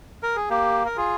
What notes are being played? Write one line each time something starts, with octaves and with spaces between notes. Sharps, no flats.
A#4
G#4
A#3 G4
A#4
F4 G#4